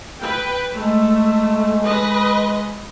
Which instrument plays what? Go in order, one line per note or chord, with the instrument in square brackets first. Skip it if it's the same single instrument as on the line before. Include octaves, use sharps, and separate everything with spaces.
[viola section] B4 G5
[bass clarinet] G#3 [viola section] A3
[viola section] B4 D#5